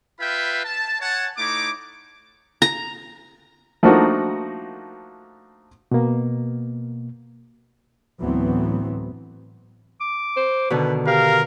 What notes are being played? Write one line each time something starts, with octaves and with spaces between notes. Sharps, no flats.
F4 B4 E5 F5 G5 B5
A5
C#5 F#5 G#5 A5
A3 D#4 E4 C#5 D6
A#5
F3 A3 A#3 D4 D#4 F#4
B2 A#3
D2 A2 E3 F#3 B3 C4
D6
C5
B2 D3 D#3 B4
G4 A#4 F5